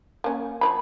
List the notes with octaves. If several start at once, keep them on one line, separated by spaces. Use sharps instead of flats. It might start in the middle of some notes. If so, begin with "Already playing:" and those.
A#3 C#4
F3 C#5 B5